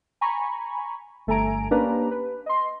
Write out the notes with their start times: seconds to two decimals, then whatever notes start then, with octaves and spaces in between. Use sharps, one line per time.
0.21 G#5 A#5 B5 C#6
1.27 G1 A3 A4 G#5 A#5 D7
1.71 A#3 C#4 D4 G4 B4 A#5
2.11 B4
2.46 D#5 C6